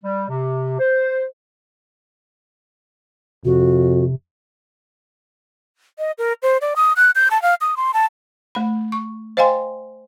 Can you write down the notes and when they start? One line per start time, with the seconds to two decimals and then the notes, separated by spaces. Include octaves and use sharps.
0.04 G3
0.29 C3
0.79 C5
3.45 F2 C3 F#4
5.98 D#5
6.18 A#4
6.42 C5
6.61 D5
6.76 D#6
6.96 F#6
7.15 G6
7.31 A5
7.42 F5
7.61 D#6
7.77 C6
7.94 A5
8.55 A3 B5
8.92 C#6
9.37 C5 D#5 F5 G5 G#5 C6